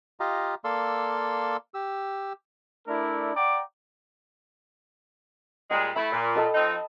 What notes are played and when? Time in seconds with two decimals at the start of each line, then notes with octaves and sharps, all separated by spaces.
0.20 F4 G4 D#5 F5 A#5
0.64 A#3 A4 D5 F5 C6 E6
1.74 G4 E6
2.87 A3 D4 E4 A#4 D5
3.35 D5 F#5 G5 A#5 D6
5.71 A#2 G3 G#3 G5
5.96 A3 E4 B5
6.13 A#2
6.35 A4 D#5 A5
6.54 F3 C4 D#4